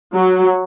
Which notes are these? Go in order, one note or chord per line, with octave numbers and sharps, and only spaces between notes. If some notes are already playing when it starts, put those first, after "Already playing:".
F#3